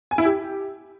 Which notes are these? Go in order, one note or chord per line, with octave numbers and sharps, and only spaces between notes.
G#5
E4
G4